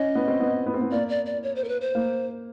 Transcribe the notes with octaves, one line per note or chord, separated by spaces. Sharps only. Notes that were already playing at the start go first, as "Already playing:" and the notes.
Already playing: C#4 D#5
B3
C4
B3
B3
C4
B3
A#3 D5
D5
D5
C#5
C5
A#4
B4
C5
A#3